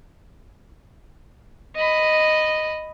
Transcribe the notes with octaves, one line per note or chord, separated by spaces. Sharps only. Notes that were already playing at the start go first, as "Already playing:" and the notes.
D#5 B5